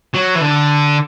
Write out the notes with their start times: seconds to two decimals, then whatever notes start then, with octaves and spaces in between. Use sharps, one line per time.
0.14 F#3
0.35 E3
0.41 D3